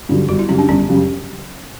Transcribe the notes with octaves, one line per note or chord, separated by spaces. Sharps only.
G2 D3 F#3
G1 F#4
E4
F#2 C#3 G3 C#4
D4
G1 C#4
F#2 C#3 G3